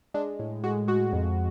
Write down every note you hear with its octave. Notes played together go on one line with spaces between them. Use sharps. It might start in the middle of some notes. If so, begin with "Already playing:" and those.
G#3 D4
A2
G#3 F#4
G#3 F#4
F2